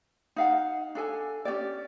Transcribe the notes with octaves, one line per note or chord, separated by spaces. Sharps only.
D#4 F5 F#5
D4 A4 G#5
C#4 D#4 G4 D5